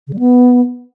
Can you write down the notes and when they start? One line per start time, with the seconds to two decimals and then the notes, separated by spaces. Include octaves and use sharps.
0.07 C#3
0.13 G3
0.19 B3